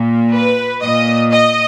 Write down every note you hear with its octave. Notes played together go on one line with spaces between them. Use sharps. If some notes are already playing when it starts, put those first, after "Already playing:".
Already playing: A#2
B4
A#2 D#5
D#5